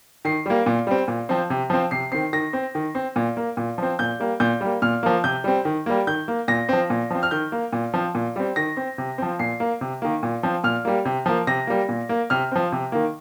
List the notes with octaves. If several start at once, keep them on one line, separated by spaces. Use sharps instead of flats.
D#3 C7
G3 A#3
A#2
G3 C4
A#2
F3 C4
C3
F3 C4
C3 C7
D#3 C4 C7
D#3 A#6
C4
D#3
C4
A#2
A#3
A#2
F3 C4
A#2 G6
G3 A#3
A#2 G6
G3 A#3
A#2 F6
F3 A#3
C3 G6
G3 C4
D#3
G3 A#3
D#3 G6
A#3
A#2 A#6
F3 C4
A#2
F3 C4
F6
D#3 G6
A#3
A#2
F3 C4
A#2
G3 C4
D#3 A#6
C4
C3
F3 C4
A#2 C7
A#3
C3
D#3 A#3
A#2
F3 C4
A#2 F6
G3 A#3
C3
F3 A#3
C3 A#6
G3 A#3
A#2
A#3
C3 F6
F3 C4
C3
D#3 A#3